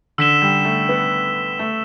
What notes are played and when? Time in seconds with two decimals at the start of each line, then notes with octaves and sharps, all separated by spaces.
0.18 D3 E6 B6 E7 G7
0.42 G3
0.65 A3
0.89 B3
1.59 A3